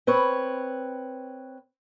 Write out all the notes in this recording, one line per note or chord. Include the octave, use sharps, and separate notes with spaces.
C4 B4 C#5